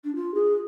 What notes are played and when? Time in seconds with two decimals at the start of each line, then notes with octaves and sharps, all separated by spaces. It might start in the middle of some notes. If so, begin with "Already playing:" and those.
0.04 D4
0.15 F4
0.34 G#4